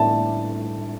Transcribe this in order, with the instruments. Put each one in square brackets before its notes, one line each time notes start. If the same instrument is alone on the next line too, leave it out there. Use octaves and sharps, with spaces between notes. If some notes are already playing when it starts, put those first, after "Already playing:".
Already playing: [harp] A2 G3 D4 [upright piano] A5